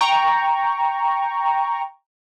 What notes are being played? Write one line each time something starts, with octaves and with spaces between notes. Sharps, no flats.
G5 A#5 C#6